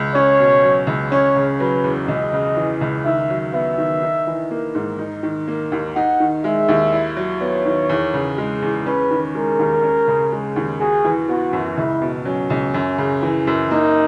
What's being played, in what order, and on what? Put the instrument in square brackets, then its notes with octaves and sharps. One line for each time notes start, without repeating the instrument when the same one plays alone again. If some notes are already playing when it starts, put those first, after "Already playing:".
Already playing: [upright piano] C#2
[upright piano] C#4 [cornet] C#5
[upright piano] B2
F#3
C#2
[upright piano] C#4 [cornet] C#5
[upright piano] C#3
[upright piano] F#3 [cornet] B4
[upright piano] E2
[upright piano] C#2 [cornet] D#5
[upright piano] C#3
E3
C#2
[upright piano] D#3 [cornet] E5
[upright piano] F#3
[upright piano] B3 [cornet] E5
[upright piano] D#3
D#4
E3
A#3
G#2
D#4
D#3
A#3
D#2
[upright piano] D#4 [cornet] F#5
[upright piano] D#3
[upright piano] G#3 [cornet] E5
[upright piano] D#2
E4
F#3
[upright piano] B3 [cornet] C#5
[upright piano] D#3
E2
C#3
G#3
E2
[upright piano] C#4 [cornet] B4
[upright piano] D#3
[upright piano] G#3 [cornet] A#4
[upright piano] D#2
C#4
C#3
G#3
D#2
[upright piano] F#4 [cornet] G#4
[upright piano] E3
[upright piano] B3 [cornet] F#4
[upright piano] F#2
[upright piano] C#2 [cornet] E4
[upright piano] B2
[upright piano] F#3 [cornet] C#4
[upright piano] C#2
F#2
C#3
E3
F#2
[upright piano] A#3 [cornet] D#4